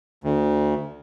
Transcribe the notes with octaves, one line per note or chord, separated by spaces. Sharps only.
D2